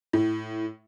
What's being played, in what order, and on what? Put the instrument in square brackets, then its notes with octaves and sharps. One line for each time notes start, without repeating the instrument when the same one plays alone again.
[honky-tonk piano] A2